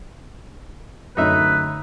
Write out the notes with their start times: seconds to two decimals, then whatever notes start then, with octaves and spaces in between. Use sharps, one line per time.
1.17 F#2 A2 D3 D#4 B4 E5